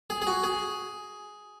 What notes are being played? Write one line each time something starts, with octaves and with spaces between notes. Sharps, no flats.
G#4
G#4
F#4
G#4